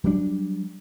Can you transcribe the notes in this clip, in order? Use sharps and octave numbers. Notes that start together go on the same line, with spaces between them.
F#3 G3 A#3 D4